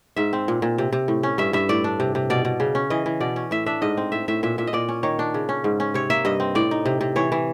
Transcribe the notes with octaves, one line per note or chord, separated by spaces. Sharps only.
G#2 E5
C4
A#2
A#2
C3
C3
A2
C#4
G2 E5
G2 E5
A2 D5
D4
C3
C3
B2 D5
B2
C#3
C#4
E3 D#5
E3
B2 D5
C#4
A2 E5
D4 E5
G#2 D#5
C4
A2 E5
A2 E5
A#2 E5
A#2 E5
D#5
A#2 D5
C#4
D#3 C#5
D4
C#3
C#4
G#2
C#4
C3 C#5
A#3 E5
G2 D#5
C4
A2 D5
D#4
C3
C3
E3 C#5
E3